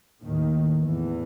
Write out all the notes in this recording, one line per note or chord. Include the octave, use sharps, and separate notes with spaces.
D#2 A2 D#3
A2
E2 A2 E3